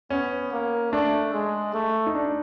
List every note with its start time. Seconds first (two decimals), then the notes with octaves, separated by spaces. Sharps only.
0.10 B3 C#4
0.52 A#3
0.92 A3 D4
1.33 G#3
1.74 A3
2.06 D#4
2.15 D4